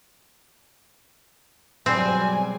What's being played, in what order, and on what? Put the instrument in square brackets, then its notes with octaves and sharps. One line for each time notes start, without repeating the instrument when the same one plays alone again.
[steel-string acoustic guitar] B2 G#4 D5 [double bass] F#3 G3 [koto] C4 [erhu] G#5